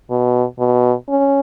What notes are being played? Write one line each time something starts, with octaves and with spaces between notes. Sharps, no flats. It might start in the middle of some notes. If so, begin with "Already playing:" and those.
B2
B2
C#4